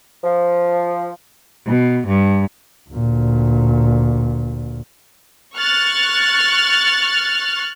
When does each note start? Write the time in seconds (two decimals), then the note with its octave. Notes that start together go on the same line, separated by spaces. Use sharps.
0.23 F3
1.67 B2
2.07 G2
2.90 D2 A#2
5.55 C#6 F6 F#6 A6